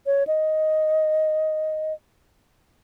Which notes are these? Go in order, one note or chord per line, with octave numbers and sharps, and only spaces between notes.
C#5
D#5